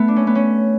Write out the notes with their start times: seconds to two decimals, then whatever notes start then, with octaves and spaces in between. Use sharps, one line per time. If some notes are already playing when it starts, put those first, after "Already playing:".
Already playing: A3 B3
0.08 D4
0.16 C#4
0.27 B3
0.35 C#4